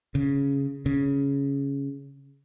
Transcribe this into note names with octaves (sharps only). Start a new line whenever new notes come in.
C#3
C#3